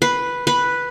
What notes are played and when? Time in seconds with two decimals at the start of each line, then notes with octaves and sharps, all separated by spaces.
0.02 B4
0.47 B4